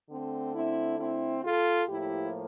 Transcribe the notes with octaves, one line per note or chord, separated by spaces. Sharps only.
D3 A3 C4
C4 E4
C4 E4
F4 A4
A2 F3 A#3 E4 G4